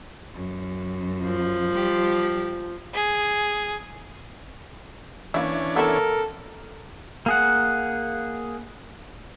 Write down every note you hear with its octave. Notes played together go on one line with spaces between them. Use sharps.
F#2
F3
G3 G4
G#4
E3 A#3 C#4 D4 E4
B3 E4 A4 A#4
A#3 G#4 F#5